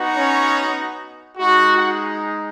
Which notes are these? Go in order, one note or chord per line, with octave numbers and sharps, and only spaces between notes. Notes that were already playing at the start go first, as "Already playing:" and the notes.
Already playing: B3 D#4 F#4
C#4 C#5
G#3 D#4 F#4
F#4 F#5